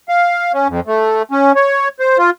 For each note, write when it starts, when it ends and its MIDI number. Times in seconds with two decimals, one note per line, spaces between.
0.09 0.52 77
0.53 0.68 61
0.69 0.80 41
0.87 1.22 57
1.31 1.52 61
1.55 1.88 73
2.00 2.18 72
2.18 2.30 65